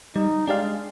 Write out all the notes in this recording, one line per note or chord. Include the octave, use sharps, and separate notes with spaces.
G3 D#4
G#3 D4 G4 D5 F5